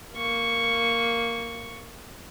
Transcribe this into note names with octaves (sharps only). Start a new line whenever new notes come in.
A#3 C#6